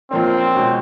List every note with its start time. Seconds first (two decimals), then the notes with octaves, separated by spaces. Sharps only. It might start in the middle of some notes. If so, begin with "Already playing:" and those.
0.11 A#1 A#2 F3 A#3 C4 C#4
0.54 C#2 B2 G#3 C#4